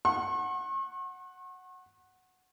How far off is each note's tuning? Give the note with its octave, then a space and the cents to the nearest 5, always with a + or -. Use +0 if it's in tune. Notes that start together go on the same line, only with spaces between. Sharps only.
F#5 +0 C#6 -45